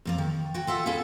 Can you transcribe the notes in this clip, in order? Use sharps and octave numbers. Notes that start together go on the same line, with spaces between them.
F2 A#3 D5
D#3
F#4 G5
F4 A4 E5 F#5
A#3 C#4 E4 G#4 A4